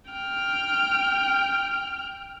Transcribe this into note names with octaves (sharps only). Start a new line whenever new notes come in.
G5 F6